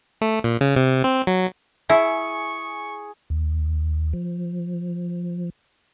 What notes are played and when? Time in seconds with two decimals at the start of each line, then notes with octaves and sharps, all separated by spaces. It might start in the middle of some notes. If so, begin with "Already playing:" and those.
0.21 A3
0.44 A#2
0.61 C#3
0.76 C3
1.04 C4
1.27 F#3
1.90 E4 G#4 E5 C#6
3.30 D#2
4.13 F3